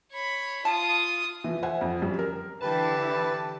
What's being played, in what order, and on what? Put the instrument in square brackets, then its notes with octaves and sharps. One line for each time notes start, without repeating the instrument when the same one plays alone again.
[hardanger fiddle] C#5 B5
[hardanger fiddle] F4 D#6 [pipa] A5
[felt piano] E3 F3
C5 E5 F#5 G#5
F2
F#2 G3
A#4
[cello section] D3 E3 E4 [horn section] G4 A5 [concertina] B4